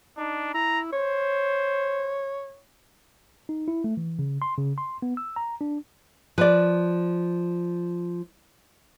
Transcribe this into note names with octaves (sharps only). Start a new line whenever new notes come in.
D4 D#4
E4 A#5
C5 C#5
D#4
E4
A3
E3
C#3
C6
C#3
C6
B3
E6
A#5
D4
F3 B4 D5